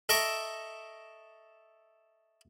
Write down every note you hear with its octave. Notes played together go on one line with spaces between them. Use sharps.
A4 D#5 E5 A#5 C#6 D6